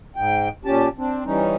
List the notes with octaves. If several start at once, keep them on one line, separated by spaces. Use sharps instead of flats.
G#2 G5
A#2 C#4 G4 A5
C4 D4
E3 G3 C#4 D#4